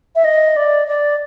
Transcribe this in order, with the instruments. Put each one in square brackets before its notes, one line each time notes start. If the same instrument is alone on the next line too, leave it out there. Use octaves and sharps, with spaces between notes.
[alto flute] E5
D#5
D5
D5